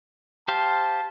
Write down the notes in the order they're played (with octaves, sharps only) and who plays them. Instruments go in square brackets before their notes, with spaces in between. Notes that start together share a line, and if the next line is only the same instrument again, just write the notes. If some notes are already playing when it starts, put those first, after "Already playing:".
[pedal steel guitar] G4 C5 F5 [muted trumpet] A5